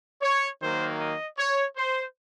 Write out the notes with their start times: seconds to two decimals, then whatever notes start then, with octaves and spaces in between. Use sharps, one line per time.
0.21 C#5
0.60 D#3 F#3 A#3 C5
0.99 D#5
1.38 C#5
1.77 C5